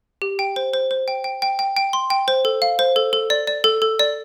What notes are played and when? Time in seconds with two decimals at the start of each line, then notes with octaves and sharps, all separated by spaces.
0.22 G4
0.39 G5
0.56 C5
0.74 C5
0.91 C5
1.08 G5
1.24 G5
1.42 G5
1.59 G5
1.77 G5
1.93 C6
2.10 G5
2.28 C5
2.45 A4
2.62 F5
2.79 C5
2.96 A4
3.13 A4
3.30 D5
3.47 D5
3.64 A4
3.82 A4
3.99 D5